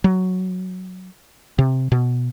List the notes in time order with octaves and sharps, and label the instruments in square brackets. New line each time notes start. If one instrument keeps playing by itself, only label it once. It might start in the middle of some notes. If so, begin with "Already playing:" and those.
[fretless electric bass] F#3
C3
B2